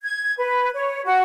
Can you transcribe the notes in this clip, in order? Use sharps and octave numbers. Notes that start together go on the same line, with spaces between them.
G#6
B4
C#5
F#4